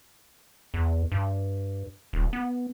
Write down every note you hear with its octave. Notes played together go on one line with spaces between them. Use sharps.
E2
G2
D#1
B3